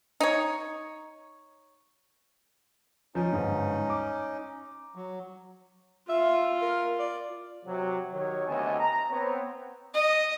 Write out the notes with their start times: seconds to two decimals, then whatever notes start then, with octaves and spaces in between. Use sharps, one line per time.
0.20 D#4 C#5
3.15 F3 C#4 D#4
3.33 G1 G#2
3.87 A#5 D6
4.96 F#3
6.09 F4 E5
6.62 A#4
6.99 D5
7.66 C3 F#3
8.12 D#3 F#3 G4 C#5
8.47 D2 C3 B3 D#5 G#5 A5
8.79 A#5
9.11 B3 C4 C#5
9.93 D#5